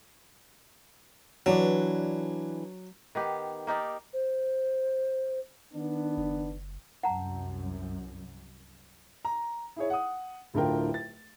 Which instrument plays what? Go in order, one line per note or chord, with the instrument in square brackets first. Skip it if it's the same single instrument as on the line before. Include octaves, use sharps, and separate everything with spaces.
[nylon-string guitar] E3 D4 D5 [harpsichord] F#3
[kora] D#3 B3 G4
A#3 D#4 G4 D5
[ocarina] C5
[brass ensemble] D#3 B3 D4
[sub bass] F#1
[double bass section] C2 F#2 [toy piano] F#5 A5 A#5
[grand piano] A#5
E4 G#4 C#5
F#5 D#6
D1 A2 D3 F4 A#4 G5
A6